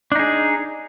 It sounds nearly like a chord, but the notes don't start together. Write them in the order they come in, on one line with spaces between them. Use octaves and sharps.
D4 D#4 G#4